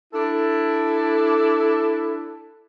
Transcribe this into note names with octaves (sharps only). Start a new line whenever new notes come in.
D4 E4 A4